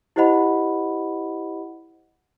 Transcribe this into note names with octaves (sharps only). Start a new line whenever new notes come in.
E4 G4 C5 D#5 F#5 B5